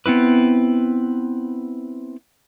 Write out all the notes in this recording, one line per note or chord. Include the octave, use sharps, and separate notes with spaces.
B3 C4 E4 B4